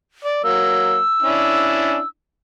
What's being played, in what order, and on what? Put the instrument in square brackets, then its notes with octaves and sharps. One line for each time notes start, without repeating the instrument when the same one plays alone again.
[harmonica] D5
[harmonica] F#3 A#3 [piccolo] E6
[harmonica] C#4 D4 E4